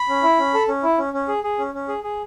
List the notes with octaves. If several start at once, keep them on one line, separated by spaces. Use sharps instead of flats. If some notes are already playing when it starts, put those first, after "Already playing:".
Already playing: B5
C#4
E4
C#4
A4
C#4
E4
C#4
C#4
G#4
G#4
C#4
C#4
G#4
G#4